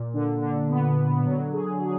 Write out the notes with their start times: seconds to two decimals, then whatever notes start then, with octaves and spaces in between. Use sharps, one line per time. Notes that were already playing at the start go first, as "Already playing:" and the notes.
Already playing: A#2
0.14 D3
0.41 D3
0.70 B3
0.97 D3
1.25 F#3
1.52 G#4
1.81 G#4